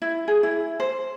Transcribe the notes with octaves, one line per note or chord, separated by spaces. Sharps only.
E4
G#4
E4
C5